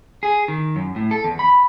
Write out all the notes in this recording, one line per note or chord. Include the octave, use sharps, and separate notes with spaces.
G#4
D#3
F#2
A2
A4
E2
B5